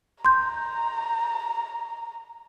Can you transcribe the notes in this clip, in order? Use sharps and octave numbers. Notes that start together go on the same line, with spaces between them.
A#5 C6 G6